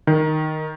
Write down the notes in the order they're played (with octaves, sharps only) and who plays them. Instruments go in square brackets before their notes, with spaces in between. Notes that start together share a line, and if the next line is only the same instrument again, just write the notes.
[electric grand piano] D#3